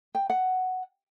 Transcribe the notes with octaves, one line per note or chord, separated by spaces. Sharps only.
G5
F#5